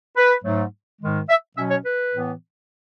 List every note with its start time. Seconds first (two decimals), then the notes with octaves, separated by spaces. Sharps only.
0.17 B4
0.44 G#2 F#3 A3
1.01 G#2 D#3 G#3
1.29 E5
1.57 B2 F#3 C#4 E5
1.70 C#5
1.85 B4
2.12 A2 E3 B3